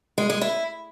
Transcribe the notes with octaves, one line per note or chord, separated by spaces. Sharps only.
G#3
G#3
E4